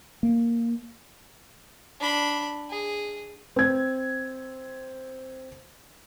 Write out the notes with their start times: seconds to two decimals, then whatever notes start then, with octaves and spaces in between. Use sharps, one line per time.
0.23 A#3
2.00 D4 B5
2.70 G#4
3.56 C4 G#6